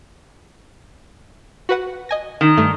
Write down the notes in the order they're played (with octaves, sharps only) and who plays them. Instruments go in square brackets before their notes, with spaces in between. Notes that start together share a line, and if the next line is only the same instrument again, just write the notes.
[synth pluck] F#4 B4 F#5
D#5 G#5 A#6
[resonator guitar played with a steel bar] D#3
[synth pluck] G2 A3